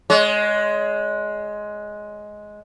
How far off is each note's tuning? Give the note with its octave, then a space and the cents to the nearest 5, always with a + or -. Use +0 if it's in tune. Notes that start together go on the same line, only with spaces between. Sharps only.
G#3 +10 C#5 +40